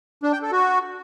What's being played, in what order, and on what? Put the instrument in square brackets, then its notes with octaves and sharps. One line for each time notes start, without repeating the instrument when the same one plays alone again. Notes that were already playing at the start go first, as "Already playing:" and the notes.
[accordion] D4
G5
A4
F#4